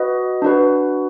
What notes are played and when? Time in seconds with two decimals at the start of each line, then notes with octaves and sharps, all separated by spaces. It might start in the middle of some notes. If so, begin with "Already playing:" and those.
Already playing: F#4 B4 D#5
0.42 D4 F#4 B4